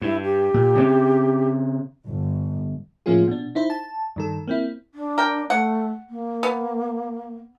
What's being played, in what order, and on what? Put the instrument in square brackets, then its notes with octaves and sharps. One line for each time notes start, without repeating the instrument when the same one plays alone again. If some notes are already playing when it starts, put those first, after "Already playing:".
[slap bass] G2 [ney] E4
[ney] G4
[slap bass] A#2
C#3 A3 C4
[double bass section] G1
[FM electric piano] A2 F3 A#3 C#4 F4 G#4
B2 D4
D#4 E4 C5
A5
G2 D#3 A4
A#3 C4 E4
[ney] D4
[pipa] A#4 G5
[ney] A3 [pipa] F#5
[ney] A#3
[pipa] B3